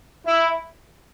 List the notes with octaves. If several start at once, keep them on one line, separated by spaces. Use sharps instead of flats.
E4